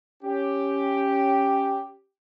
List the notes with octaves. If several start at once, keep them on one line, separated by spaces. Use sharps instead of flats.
C#4 G4